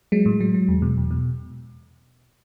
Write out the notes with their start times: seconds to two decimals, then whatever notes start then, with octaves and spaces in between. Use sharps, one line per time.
0.12 F#3 G#3
0.26 A2
0.40 F#3
0.54 F#3
0.68 E2
0.82 B2
0.97 E2
1.11 B2